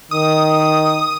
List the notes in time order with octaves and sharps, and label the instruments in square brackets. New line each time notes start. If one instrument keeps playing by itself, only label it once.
[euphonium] D#3 [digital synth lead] D#6